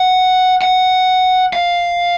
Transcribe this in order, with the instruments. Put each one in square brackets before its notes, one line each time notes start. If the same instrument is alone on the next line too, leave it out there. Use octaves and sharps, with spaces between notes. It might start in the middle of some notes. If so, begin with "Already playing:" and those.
Already playing: [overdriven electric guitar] F#5
F#5
F5